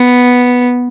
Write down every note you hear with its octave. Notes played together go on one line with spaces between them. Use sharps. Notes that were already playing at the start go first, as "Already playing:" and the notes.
Already playing: B3